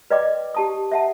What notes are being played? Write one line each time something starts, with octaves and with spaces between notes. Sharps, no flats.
B4 D5 D#5 G5 D6
G4 A5 D#6
E5 F#5 A5